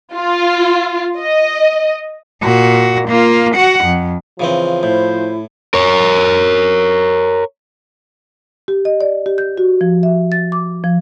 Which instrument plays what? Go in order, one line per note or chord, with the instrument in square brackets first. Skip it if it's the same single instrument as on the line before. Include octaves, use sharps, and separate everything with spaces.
[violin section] F4
D#5
[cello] A#2 F#4
A#3 F4
F#4 F#5
F2
[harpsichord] C#3 E3 C4 [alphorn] F3
[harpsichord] A2 [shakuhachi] E4 [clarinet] C5
[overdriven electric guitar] A#4 C#5
[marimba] G4
D#5
D5
G4
G6
F#4
F3
E5
A6
D6
F3